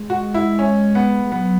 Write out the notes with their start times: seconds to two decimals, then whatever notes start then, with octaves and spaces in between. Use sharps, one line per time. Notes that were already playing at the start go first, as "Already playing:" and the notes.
Already playing: G#3
0.10 F#4
0.34 E4
0.59 C#4
0.95 B3
1.26 G#3
1.32 F#3 B3